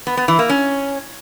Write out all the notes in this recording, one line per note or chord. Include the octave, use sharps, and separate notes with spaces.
B3
B3
E3
A#3
C#4